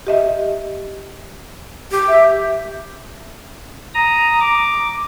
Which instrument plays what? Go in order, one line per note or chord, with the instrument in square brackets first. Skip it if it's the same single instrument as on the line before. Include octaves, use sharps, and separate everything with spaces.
[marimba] G4 D#5 E5
[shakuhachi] G4
[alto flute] E5
[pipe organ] A#5 D#6
D6